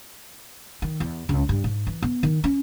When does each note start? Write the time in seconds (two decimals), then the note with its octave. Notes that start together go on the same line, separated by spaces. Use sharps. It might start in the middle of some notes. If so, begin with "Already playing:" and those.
0.82 D#3
1.00 E2
1.29 C#2
1.49 G2
1.64 G#2
1.87 E3
2.03 B3
2.23 D#3
2.44 C#4